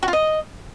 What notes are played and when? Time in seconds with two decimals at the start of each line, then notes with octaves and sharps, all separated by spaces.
0.03 F#4
0.08 F4
0.13 D#5